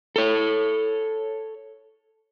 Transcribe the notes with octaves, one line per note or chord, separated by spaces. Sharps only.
A4 C#5